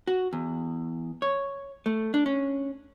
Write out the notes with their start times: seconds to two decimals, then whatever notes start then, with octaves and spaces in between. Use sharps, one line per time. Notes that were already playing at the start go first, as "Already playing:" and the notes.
0.07 F#4
0.33 E2
1.22 C#5
1.86 A3
2.14 D4
2.26 C#4